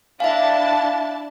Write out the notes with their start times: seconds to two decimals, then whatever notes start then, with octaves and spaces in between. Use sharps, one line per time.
0.20 D4 E4 E5 F5 A5